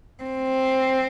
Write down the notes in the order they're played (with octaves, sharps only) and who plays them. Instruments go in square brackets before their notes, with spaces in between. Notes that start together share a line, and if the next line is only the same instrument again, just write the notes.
[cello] C4